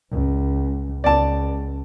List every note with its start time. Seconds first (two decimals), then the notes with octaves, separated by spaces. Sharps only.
0.11 C#2
1.04 C#2 D5 A5